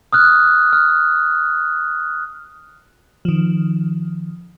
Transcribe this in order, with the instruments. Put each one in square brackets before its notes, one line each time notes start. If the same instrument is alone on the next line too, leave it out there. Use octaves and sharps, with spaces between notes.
[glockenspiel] D#6 F6 F#6
F6
[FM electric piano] D#3 F3